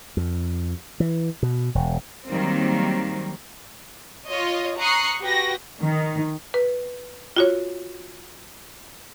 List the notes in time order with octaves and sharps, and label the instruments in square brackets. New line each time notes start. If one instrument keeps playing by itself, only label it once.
[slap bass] F2
E3
B2
E1
[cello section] D#3 F#3 G3 A#3 C4
[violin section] F4 C#5 D#5
A#5 C#6 D#6 F#6 C7 C#7
F#4 G4 B4 A#6
[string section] D#3
[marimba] B4
F4 F#4 C#5